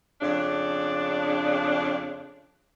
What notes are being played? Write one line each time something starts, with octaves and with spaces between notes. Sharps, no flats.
F2 C#3 D4